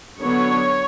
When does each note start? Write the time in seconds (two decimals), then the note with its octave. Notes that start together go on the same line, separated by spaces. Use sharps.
0.19 D3 F#3 B3 D4 C#5